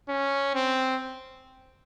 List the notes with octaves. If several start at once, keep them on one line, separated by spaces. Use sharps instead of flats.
C#4
C4